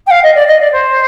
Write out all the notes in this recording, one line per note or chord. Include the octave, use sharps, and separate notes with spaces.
G5
F5
D#5
D5
D#5
D5
C5